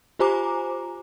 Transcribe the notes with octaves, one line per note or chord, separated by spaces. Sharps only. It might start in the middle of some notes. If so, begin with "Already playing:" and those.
F4 G4 C5 G#5 A#5 D6